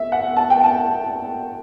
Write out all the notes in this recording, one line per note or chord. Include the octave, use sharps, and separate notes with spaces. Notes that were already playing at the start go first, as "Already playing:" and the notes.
Already playing: E5
F#5
A5
G5
A5